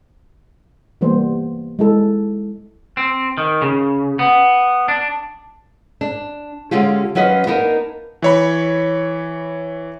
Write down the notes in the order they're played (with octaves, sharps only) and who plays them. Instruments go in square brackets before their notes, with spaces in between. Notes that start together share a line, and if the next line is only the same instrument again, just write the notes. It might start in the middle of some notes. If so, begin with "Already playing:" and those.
[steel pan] E3 G3 A#3 B3 C5
G#3 E4 A4
[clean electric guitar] C4
D#3
C#3
B3
D4
[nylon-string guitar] D4
D3 G#3 C#4 F4 G4
F#3 C#4 F4 B4 D#5 F5
A#3 B3 D4 D#4 A#4
[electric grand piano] E3 C#5 B5